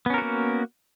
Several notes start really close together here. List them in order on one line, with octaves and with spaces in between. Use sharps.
B3 C#4 A#4 F#4 A#3